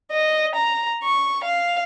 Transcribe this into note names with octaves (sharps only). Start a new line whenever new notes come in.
D#5
A#5
C#6
F5